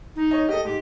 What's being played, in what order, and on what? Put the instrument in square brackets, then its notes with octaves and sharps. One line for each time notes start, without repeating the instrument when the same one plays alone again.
[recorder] D#4
[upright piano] C#5 D#5
[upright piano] G4 A4 [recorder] D#5
[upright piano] G#2 [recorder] G4